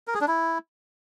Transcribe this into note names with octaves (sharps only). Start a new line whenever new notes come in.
A#4
G#4
D4
E4